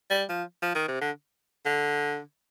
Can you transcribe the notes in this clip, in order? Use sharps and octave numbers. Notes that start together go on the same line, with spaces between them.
G3
F3
F3
D#3
C3
D3
D3